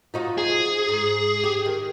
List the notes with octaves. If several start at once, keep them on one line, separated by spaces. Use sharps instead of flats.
F3 D#4 F#4
G#4
G#2
G4
D#3